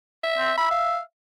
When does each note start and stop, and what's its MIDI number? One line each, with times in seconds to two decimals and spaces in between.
0.23 0.57 76
0.38 0.52 60
0.58 1.00 76
0.58 0.68 83
0.71 1.00 77